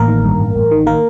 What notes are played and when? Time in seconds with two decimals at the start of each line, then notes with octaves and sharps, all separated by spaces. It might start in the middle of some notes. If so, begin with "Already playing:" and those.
Already playing: A1 A#3 A#4
0.08 D#3
0.24 G2
0.40 A1
0.56 A1
0.71 D#3
0.87 A#3 A#4